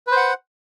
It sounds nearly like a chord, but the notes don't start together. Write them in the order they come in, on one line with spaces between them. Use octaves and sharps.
B4 C5 F#5